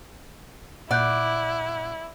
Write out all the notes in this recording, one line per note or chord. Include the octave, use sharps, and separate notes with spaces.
A#2 E4 D5 F#5 F#6 G6